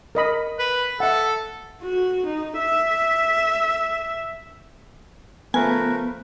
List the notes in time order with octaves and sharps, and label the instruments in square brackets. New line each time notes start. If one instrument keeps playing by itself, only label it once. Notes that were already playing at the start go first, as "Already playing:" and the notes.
[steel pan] A#4 D#5 B5
[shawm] B4
[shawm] A4 [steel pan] E5 F#5
[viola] F#4
D#4
E5
[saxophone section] C#3 F3 A3 [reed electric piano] B3 [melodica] A#4 B4 [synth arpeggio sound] G#5